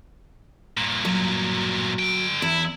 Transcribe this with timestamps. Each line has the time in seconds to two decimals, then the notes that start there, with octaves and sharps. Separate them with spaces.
0.77 G2 A#2
1.05 F#3
1.99 D3 G5
2.42 E2 E4